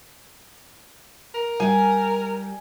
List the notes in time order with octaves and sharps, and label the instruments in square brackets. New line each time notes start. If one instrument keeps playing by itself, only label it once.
[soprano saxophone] A#4
[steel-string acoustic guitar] G3 [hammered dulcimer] G#5